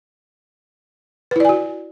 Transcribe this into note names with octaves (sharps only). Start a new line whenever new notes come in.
E4 F#4 B4 D5 G#5